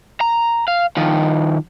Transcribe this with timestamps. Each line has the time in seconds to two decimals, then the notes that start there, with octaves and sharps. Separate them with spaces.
0.21 A#5
0.68 F5
0.97 D#3 F3